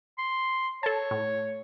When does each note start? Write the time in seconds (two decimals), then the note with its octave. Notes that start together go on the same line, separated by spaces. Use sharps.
0.18 C6
0.83 A4 C#5 A5
1.11 A2